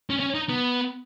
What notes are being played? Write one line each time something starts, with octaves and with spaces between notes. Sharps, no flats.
C#4
C#4
D#4
B3